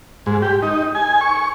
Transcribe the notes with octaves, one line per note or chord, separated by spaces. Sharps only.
G#2
G4
D#4
G#5
C#6